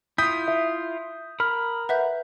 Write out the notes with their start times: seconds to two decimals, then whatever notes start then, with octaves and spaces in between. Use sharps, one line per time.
0.18 E4 F4 D#6 G6 B6
0.48 E5
1.40 A#4 B5 F6
1.89 B4 E5 F#5 G6